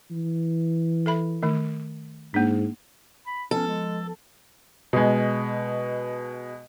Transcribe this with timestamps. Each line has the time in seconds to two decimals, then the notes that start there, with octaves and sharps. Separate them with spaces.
0.11 E3
1.06 A4 E5 B5
1.43 D#3 A3
2.34 G#2 A#3 D4
3.27 B5
3.51 F3 B3 C#4 A4
3.68 G#3
4.93 B2 G#3